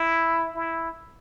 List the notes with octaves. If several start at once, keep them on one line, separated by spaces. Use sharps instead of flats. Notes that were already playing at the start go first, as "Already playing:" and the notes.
Already playing: E4
E4